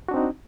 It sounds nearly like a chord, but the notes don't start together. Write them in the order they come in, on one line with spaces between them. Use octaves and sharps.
F#4 D4 C4 D#4